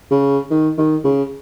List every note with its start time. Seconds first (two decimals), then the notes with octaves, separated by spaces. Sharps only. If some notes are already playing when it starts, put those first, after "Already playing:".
0.11 C#3
0.51 D#3
0.78 D#3
1.04 C#3